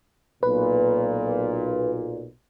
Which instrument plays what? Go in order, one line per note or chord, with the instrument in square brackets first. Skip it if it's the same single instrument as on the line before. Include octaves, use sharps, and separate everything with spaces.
[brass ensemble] B1 A#2 [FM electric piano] B4